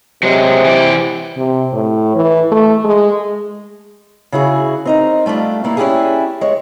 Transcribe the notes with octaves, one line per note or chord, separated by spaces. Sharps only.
C3 F#3 G#3
E3 D5
C3
A2
E3
A3
G#3
C#3 E4 F#4 G#4
C4 D#4 A#4
G3 A3 C#4 D4 F4
G3 A#3 E4
C#4 D4 E4 F4 G4 G#4
G#3 C#5